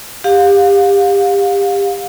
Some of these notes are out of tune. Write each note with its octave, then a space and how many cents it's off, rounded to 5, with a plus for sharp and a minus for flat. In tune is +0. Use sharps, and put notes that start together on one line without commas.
G4 +25 F5 +30